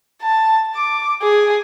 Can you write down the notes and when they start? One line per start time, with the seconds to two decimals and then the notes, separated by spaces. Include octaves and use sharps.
0.22 A5
0.75 D6
1.22 G#4